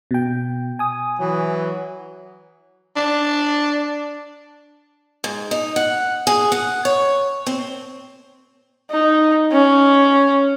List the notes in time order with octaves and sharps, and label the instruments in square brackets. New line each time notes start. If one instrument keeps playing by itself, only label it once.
[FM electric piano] B2 G5
G#5 D#6
[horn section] E3 F#3
[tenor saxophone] D4
[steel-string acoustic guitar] G#2
D#4
F#5
G#4
F#5
C#5
C4
[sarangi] D#4
C#4